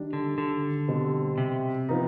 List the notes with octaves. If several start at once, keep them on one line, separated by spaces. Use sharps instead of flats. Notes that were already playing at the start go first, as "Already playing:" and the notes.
Already playing: D#3 G3 D4
D3
D3
B2 G3 C4
C3
F3 B3 D#4